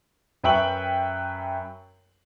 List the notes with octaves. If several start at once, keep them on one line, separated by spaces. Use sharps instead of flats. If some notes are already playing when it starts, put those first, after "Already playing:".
F#2 B4 E5 G5 C#6 F#7